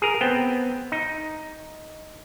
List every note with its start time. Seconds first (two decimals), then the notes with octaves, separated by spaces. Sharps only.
0.02 G#4 A#4
0.21 B3 C4 G5
0.92 D#4